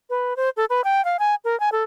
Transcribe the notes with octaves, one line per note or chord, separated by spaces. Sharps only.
B4
C5
A4
B4
G5
F5
G#5
A#4
G#5
A4